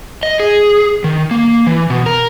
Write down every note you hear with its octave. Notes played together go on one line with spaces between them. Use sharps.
D#5
G#4
D#3
A#3
E3
B2
A#4